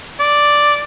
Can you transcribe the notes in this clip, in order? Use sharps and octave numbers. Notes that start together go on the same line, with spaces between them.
D5